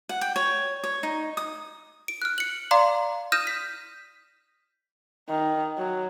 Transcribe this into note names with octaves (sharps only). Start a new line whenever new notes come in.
F#5
G5
C#5
C#5
D#4
D#6
D7
F6 F#6
C#7 F#7
D5 F5 A#5 C6 D6
D#6 F6 G6 A#6 D#7 E7
B6
D#3
F#3